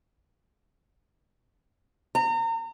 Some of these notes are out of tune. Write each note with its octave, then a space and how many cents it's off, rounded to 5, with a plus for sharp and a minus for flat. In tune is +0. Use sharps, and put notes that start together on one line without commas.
A#5 -35